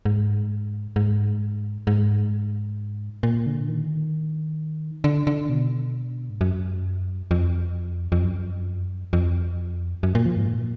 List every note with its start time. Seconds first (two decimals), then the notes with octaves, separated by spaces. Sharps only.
0.05 G#2
0.96 G#2
1.87 G#2
3.23 A#2
3.46 D3
3.68 D#3
5.04 D3
5.27 D3
5.49 B2
6.30 G#2
6.41 F#2
7.31 F2
8.12 F2
8.23 F#2
9.13 F2
10.03 F#2
10.15 A#2
10.26 F3
10.37 G#2
10.48 A#2